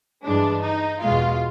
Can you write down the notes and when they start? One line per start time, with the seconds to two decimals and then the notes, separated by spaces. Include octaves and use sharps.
0.25 G2 E3 G#3 D4
0.63 D#4
1.02 E2 B2 G#3 F4